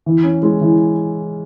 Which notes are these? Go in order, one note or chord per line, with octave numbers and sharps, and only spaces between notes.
E3
C#4
G#3
E3